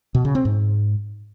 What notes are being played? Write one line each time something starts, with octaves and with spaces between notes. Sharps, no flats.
B2
C#3
C4
G#2